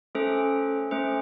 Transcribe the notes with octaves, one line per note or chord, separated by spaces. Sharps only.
A3 C#4 A4 C5
A3 C#4 A4 C5